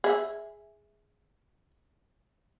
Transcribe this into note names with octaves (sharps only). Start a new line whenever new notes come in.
G#4 E5